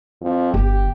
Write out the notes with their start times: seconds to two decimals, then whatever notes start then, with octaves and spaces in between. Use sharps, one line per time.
0.21 F2
0.54 G1 G4